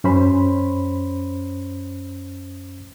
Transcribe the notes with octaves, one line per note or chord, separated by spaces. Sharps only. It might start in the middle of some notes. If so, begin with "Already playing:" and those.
F#2 C#4 C5 B5